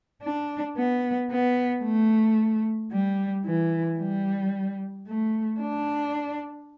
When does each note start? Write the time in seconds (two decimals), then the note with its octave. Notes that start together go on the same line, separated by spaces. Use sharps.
0.23 D4
0.77 B3
1.31 B3
1.84 A3
2.92 G3
3.46 E3
3.99 G3
5.07 A3
5.61 D4